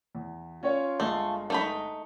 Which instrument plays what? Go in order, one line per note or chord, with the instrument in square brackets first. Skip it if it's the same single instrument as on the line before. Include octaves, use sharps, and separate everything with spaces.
[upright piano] E2
[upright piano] C#4 C#5 [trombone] F4
[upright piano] G1 G#3 [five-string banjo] A3
[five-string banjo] A3 D#4 B5